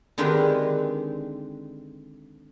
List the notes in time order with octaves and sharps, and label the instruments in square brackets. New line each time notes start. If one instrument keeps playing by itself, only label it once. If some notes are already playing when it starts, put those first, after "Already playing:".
[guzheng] D3 D#3 G#3 C4 G4 B4